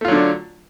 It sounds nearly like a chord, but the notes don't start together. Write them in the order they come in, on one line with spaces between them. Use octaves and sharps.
A3 F4 F#3 D3 D4